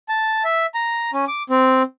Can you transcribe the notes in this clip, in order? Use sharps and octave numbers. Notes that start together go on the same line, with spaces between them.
A5
E5
A#5
C#4
D6
C4